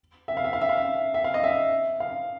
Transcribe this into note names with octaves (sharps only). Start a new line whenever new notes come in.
E5
F5
E5
F5
E5
F5
E5
E5
F5
D#5
E5
F5